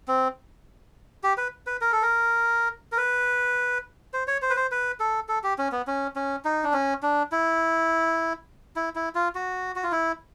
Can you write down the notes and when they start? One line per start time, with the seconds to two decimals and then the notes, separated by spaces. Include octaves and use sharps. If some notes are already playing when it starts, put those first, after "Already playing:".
0.08 C4
1.23 G4
1.38 B4
1.67 B4
1.81 A#4
1.92 A4
2.02 A#4
2.92 A#4
2.97 B4
4.13 C5
4.27 C#5
4.42 C5
4.50 B4
4.57 C5
4.71 B4
5.00 A4
5.29 A4
5.44 G4
5.58 C#4
5.72 B3
5.87 C#4
6.16 C#4
6.45 D#4
6.64 D4
6.73 C#4
7.03 D4
7.32 E4
8.76 E4
8.95 E4
9.15 F4
9.35 F#4
9.76 F#4
9.83 F4
9.92 E4